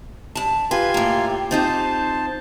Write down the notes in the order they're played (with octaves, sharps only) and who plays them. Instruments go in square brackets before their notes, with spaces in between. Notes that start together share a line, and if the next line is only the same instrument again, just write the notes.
[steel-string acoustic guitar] G2 A5
[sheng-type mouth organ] F4 G#5 C6 [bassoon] G4 [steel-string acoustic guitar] B4
[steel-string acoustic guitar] A2 A#3
[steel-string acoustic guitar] C4 D#4 F4 [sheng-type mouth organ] C5 A5